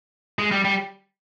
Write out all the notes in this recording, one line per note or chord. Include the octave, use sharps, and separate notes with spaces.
G#3
G3
G3